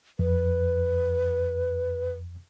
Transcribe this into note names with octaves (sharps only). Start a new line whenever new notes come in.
F2 B4